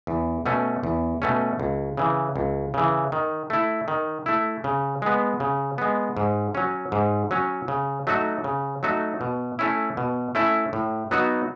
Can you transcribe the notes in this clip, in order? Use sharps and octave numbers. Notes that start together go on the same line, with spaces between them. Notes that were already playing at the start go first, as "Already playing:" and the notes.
E2
B2 A3 C#4
E2
B2 A3 C#4
C#2
C#3 E3
C#2
C#3 E3
D#3
A3 E4
D#3
A3 E4
C#3
G#3 B3
C#3
G#3 B3
G#2
F#3 C#4
G#2
F#3 C#4
C#3
F#3 A3 D#4 F#4
C#3
F#3 A3 D#4 F#4
B2
A3 C#4 E4
B2
A3 C#4 E4
A2
F#3 B3 D#4 F#4